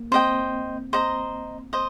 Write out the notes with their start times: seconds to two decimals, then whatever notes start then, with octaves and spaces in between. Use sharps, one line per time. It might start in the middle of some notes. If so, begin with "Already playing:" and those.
Already playing: A#3
0.12 C4 C5 D#5 G5
0.93 C5 D#5 A#5
1.73 C5 D#5